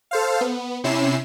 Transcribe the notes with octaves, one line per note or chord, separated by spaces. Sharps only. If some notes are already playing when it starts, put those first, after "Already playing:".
A4 C5 F5
B3
C3 C#4 E4 C7 E7